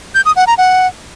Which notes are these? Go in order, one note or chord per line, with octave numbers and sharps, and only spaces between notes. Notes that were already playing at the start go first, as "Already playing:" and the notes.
G6
D#6
F#5
A#5
F#5